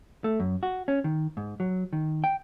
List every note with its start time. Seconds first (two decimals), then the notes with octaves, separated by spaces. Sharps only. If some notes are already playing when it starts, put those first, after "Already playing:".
0.24 A3
0.40 F#2
0.63 F#4
0.88 C#4
1.04 D#3
1.37 G#2
1.60 F#3
1.93 D#3
2.24 G5